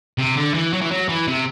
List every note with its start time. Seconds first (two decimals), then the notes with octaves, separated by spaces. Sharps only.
0.18 C3
0.36 D3
0.54 E3
0.73 F#3
0.81 E3
0.91 F#3
1.08 E3
1.28 C3